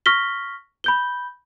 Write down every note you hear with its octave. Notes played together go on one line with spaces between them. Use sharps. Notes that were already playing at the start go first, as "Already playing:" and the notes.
C#6 F6 A#6 B6 G7
B5 G6 G7